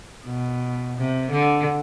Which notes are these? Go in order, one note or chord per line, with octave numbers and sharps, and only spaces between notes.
B2
C3
D3